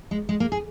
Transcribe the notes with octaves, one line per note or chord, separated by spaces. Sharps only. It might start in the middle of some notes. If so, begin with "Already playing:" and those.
G#3
G#3
A#3
G#4